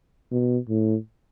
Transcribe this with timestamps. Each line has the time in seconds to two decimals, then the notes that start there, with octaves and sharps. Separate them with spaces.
0.32 B2
0.69 A2